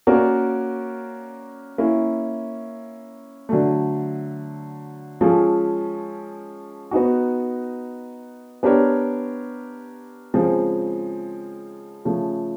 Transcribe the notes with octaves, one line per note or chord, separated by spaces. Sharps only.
A#3 C#4 F#4 A#4 D5
A#3 C#4 E4
D3 F#3 A3
F3 G#3 C#4 F4 A4
B3 D#4 F#4
B3 D4 G4 A#4 C#5
C#3 F3 G#3 C4
C#3 F3 A3